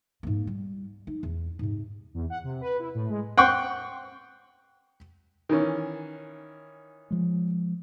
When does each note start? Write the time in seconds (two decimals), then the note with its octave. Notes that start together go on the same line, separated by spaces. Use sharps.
0.23 G#2 A#3
0.47 G3
1.07 D#4
1.23 E2
1.59 G#2 C3
2.14 E2
2.30 F#5
2.44 C3
2.61 B4
2.79 E4
2.95 A2
3.09 G#3
3.38 F#5 G5 C6 C#6
5.49 D#3 E3 C#4
7.10 F3 G#3